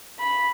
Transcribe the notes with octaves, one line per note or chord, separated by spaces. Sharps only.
B5